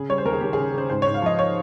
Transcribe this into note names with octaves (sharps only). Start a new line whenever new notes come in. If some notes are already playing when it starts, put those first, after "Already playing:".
Already playing: C#3 G#4
G3 C#5
C5
D#2 A#4
G#4
D#2 G4
C#3 G#4
C#3 C5
G#2 C5
G#2 C#5
F5
F3 D#5
C#5